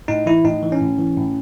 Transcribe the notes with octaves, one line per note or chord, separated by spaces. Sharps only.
A2 D#4
E3 E4
A2 D#4
E3
C#4
A2
E3
A2